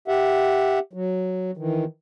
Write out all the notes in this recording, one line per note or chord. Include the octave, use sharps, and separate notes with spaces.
G4 E5 F#5
F#3
D#3 E3